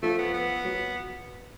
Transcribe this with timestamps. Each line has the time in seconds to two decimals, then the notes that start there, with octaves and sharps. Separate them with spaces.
0.03 F3 A3
0.19 B3
0.34 B3
0.65 F#3